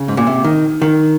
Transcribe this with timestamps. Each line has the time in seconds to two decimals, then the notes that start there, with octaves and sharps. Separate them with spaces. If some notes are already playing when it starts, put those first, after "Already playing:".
Already playing: C#3
0.08 G#2
0.17 A#2
0.27 C3
0.44 D#3
0.82 D#3